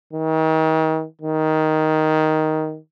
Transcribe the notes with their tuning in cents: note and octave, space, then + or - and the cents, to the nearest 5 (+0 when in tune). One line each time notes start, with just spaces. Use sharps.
D#3 +35
D#3 +5